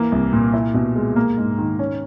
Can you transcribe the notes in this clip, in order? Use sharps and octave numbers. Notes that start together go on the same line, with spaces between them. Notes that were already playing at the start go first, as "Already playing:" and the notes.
Already playing: E3 A#3
C2
A#2
E4
B2
G#3
A#3
G#2
D#3
C#4